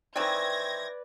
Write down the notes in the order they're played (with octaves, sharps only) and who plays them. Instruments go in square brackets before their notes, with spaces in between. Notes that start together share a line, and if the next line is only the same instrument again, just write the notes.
[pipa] D#3 E3 C4 [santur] B4 D5 [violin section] G#6 A#6